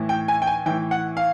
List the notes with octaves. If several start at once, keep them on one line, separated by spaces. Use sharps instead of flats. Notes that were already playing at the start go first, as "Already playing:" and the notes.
Already playing: A2 E3
G5
G#5
G5
G#5
A2 E3 G5
F#5
F5